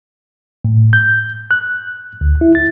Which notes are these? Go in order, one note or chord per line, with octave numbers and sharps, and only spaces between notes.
A2
G6
F#6
D2
E4
A6